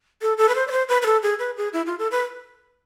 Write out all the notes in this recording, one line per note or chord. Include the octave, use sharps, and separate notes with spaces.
A4
A4
B4
C5
D5
C5
B4
B4
A4
G#4
B4
G#4
E4
F4
A4
B4